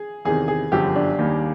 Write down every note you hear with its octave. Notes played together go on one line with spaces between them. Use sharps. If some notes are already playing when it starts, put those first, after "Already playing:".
Already playing: G#4
E2 C3 D#3 G#4
G#4
G1 F#2 D3 F3 G4
D4
D#2 D#3 G3 A#3